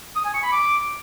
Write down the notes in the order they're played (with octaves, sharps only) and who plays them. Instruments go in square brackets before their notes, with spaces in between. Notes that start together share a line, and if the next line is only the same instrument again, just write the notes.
[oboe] D#6
G#5
C#6
B5
D6